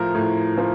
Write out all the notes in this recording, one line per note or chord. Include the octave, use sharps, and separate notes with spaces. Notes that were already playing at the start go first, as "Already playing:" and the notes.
Already playing: A2 F3 A#4
A2
F3